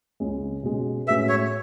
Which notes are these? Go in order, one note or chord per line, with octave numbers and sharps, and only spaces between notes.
C#2 C#3 G#3 C#4
B2 G#3 C#4
A2 G#3 C#4 F#4 B4 E5
C#5